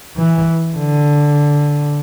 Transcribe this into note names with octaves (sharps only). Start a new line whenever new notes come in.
E3
D3